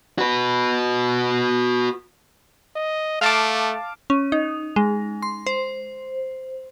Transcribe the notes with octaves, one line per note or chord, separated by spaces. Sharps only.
F#4 B4
D#5
A3 F5 A5 D6
C#4
D#4
G#3
C6
C5